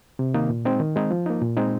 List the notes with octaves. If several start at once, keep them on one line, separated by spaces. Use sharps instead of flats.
C3
D#3 A#3 D#4
A#2
G#3 C4 D#4
D#3
G#3 C4 D#4
F3
A#3 D#4
A#2
G#3 C4 D#4